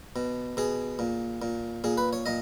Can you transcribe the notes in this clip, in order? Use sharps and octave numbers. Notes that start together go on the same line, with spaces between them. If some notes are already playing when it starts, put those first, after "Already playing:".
B2
B2 G#4
A#2
A#2
A#2 G#4
B4
C#5
A#2 D#5